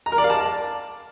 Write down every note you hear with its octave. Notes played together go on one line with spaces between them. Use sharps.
A#5
A#4
D5
F5
A5